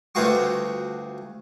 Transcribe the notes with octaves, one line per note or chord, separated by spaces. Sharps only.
D2 G2 A3 F4 F#4 C#6